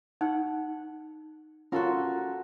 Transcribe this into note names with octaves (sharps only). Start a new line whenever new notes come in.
D#4 F#5
C#4 F4 F#4 A4 A#4